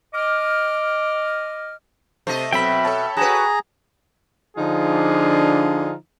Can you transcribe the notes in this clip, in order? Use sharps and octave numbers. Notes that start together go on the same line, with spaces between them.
D#5 D6 F6
C3 A3 C5 D#5
B2 F#3 C4 A4 E5 G5 B5
A4 C#5 A5
F#4 G#4 B4 A#5
D3 F3 D4 D#4 F4 G#4